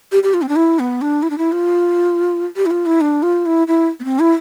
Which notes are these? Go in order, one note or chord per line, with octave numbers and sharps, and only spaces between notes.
G4
G4
F4
C4
D4
E4
B3
D4
E4
D4
E4
F4
G4
E4
F4
E4
D4
F4
E4
E4
B3
C4
E4